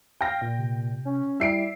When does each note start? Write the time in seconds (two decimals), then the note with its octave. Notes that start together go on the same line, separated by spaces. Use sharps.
0.21 F5 G5 A#6
0.41 A#2
0.58 C3
1.05 C#4
1.40 G3 E4 E5 C7 D7